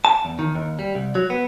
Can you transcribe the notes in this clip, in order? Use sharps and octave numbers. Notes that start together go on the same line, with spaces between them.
A5
E2
D#3
D#2
G3
C2
F#3
B3